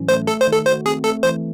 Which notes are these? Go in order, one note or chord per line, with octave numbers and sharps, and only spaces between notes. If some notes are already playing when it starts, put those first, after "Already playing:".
Already playing: A2 E3 F#3 C#4
A3 C5
A3 A4
C5
D#3
A4
F#4 C5
C4 G#4
A3 A4
E3 C5